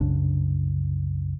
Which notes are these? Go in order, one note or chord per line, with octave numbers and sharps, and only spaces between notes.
C2 F#2 C#3 D4